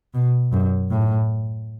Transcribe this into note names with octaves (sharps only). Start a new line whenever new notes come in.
B2
F#2
A2